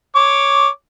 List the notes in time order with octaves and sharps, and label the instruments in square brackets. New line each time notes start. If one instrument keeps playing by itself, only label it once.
[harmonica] C#5 D6